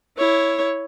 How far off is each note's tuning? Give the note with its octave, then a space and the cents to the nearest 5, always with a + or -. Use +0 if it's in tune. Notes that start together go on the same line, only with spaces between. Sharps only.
E4 +0 C#5 +0